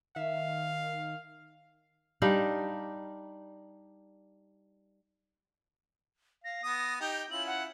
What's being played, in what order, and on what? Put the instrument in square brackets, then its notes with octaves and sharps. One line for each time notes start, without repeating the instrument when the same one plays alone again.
[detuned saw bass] D#3 [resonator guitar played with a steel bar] E5 [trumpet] F5
[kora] G3 D4 D#4 F5
[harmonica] F5 [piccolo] A#6
[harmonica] B3 D#6
[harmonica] D#4 G4 [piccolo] G5
[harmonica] C#4 E4 F4 [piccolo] F#7
[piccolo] F#5